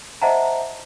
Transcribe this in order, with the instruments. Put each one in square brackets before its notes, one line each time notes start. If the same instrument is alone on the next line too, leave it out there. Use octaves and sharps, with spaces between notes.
[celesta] C5 D#5 E5 F#5 A5 A#5